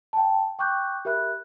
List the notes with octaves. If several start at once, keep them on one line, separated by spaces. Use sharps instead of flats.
G5 A5
G5 C#6 D6 F#6 G6
G4 A#4 E5 B5 F#6